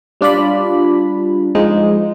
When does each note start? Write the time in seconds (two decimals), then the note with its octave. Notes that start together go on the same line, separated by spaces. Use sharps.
0.21 G3 D4 F4 D5 B5
1.55 F3 G#3 D#4